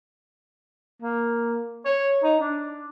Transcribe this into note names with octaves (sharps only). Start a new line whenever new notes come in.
A#3
C#5
D#4
D4